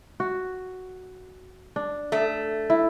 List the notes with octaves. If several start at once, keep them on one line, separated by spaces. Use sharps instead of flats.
F#4
D4
A3
E4